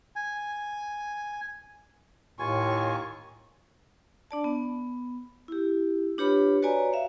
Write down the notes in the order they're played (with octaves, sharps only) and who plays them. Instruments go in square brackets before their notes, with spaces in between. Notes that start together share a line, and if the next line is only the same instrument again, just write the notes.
[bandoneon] G#5
[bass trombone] D#2 [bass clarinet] A2 [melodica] F4 G#5 [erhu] C#6
[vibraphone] D4 D5 A5
B3
E4 G4
D4 F4 G4 B4 C#5 B5
F#4 B4 C#5 D5 G#5 A#5
E5 F5